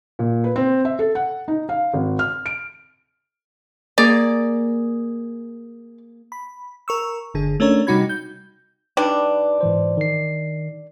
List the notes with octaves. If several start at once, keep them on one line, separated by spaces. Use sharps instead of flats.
A#2
B4
C4
E5
A4
F#5
D#4
F5
G#1
F6
D7
A#3 G#4 A#4 D5
B5
A#4 C#6 E6
G1 D3 G#4
A3 C#4 D4 A#4 C#5
C3 G3 D#4 F#4 B5 G#6
G6
G3 D4 D#4 B4
G#2 E3 C5
D#3 C7